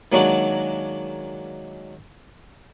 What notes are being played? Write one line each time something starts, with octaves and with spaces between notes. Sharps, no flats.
D#3 F#3 G#3 A#3 D4 F#4